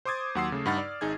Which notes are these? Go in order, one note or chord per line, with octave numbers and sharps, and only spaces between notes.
C5 C6 D6 D#6 G#6 A6
D#2 F#3 F#5 C6 E6 C7
C#3 A3
G2 D#4 F#5 B5 F6 A6
D5
G#1 D#4 G#4 G#6